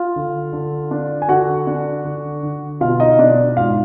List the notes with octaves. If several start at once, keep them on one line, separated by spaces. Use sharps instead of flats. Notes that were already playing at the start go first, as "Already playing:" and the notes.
Already playing: F4 F5
D3
D3
D4
G#5
D3 F#4 F#5
D4
D3
D3
B2 F4 F5
D#4 D#5
B2 D4 D5
G#2 F4 F5